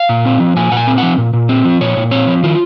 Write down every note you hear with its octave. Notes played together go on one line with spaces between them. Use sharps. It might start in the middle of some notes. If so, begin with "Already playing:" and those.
Already playing: F5
A#2
C4
F3
A#2 G#5
A#2 F#5
G#5
C4
F3 F#5
A#2
A#2
C4
F3
A#2 C#5
A#2
C4 C#5
F3
D#3 F4